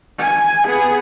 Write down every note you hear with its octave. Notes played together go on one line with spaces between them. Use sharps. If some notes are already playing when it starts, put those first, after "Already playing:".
G#5
B3 G#4